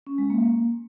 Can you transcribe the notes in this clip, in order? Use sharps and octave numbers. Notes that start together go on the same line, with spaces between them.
C#4
G#3
A#3